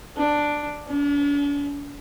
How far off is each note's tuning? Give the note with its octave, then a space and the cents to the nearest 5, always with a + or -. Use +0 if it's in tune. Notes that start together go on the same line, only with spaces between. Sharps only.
D4 +5
D4 -45